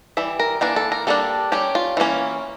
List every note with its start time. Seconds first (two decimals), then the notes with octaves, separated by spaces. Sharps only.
0.17 E3 G3 E5
0.39 A#4
0.61 E3 A#3 D4 A#4
0.76 A4
0.92 A#4
1.07 G3 A#3 D4 A4
1.52 G3 C#4 G4
1.75 F4
1.97 E3 A#3 C#4